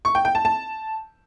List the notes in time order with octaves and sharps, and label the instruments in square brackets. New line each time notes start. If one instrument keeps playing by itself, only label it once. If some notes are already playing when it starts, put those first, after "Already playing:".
[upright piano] C#6
G5
G5
A5
A5